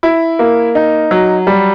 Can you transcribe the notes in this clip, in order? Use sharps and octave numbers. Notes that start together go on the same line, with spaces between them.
E4
A#3
D#4
F#3
G3